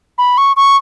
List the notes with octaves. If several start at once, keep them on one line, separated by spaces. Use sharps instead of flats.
B5
C#6
C#6